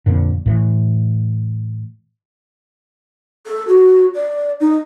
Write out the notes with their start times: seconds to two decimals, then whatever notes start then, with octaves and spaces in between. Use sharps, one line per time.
0.06 F2 A#2 D3
0.46 A2 E3
3.46 A4
3.68 F#4
4.15 D5
4.60 D#4